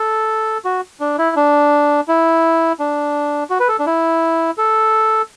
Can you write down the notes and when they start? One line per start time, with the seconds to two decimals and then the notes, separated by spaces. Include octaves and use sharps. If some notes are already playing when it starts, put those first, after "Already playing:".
Already playing: A4
0.65 F#4
1.00 D4
1.18 E4
1.36 D4
2.08 E4
2.80 D4
3.50 F#4
3.60 B4
3.69 A4
3.79 D4
3.87 E4
4.58 A4